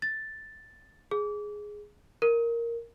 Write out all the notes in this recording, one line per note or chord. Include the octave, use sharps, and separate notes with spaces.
A6
G#4
A#4